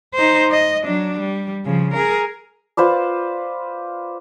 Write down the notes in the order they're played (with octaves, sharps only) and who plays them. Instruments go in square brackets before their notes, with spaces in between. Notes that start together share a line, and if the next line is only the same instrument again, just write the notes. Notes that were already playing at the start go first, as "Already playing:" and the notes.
[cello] D#4 C5
D#5
F#3 D4
G3
C#3 F3
G#4 A#4
[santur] F4 B4 C5 D5